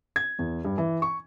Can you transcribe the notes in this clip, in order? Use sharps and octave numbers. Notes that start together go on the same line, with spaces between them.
G#6
E2
G2
E3
C#6